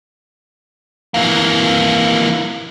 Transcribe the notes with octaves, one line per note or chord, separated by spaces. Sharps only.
E3 A#3